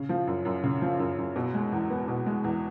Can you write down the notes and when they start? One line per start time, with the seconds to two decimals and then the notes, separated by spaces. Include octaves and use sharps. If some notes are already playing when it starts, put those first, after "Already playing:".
Already playing: C#3
0.09 F3
0.27 F#2
0.45 F#2
0.64 C#3
0.82 F3
0.99 F#2
1.18 F#2
1.36 B2
1.54 G#3
1.72 E2
1.90 B3
2.08 B2
2.26 G#3
2.44 E2